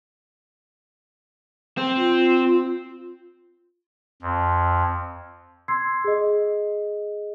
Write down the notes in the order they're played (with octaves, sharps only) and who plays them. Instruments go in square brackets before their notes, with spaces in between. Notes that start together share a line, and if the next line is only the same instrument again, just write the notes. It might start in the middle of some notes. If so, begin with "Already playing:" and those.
[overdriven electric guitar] C4
[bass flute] F4
[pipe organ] F2
[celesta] C6 E6 G#6 C7
G#4 D#5